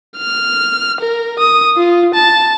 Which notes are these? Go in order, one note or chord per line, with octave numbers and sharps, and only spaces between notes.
F6
A#4
D#6
F4
A5